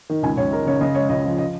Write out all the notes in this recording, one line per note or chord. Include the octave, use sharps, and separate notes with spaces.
D#3
C#2 G#5
C#2 C#5
G#3 A#4
C#3 C#5
C#3 D#5
G#3 C#5
C#2 D#5
F3
D#5